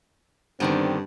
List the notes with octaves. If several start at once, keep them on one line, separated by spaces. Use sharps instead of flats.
G2 D3 D#3 B3 C4